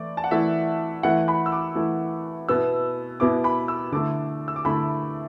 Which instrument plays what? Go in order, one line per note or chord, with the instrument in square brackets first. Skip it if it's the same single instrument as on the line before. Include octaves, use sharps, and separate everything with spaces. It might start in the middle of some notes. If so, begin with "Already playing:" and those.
Already playing: [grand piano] E3 A3 E4 D5
A5
F#5
E3 A3 E4 E5
E3 A3 E4 F#5
B5
E6
D6
E3 A3 E4
B2 B3 E4 E6
B2 B3 E4 D6
B5
E6
D3 A3 E4 D6
E6
D6
D3 A3 E4 B5